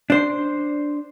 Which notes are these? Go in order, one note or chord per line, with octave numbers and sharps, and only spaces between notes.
D4 C5